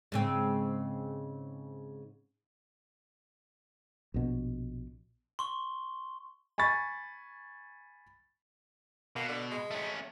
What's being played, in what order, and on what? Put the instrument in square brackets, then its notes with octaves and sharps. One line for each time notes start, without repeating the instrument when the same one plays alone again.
[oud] G#2 C#3 C4
[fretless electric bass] A#1 B2
[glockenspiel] C6 C#6 G7
[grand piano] G#5 B5 C#6 A6
[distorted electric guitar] B2 [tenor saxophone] A#3
[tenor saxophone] D3
G#3
[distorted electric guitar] A3 C#4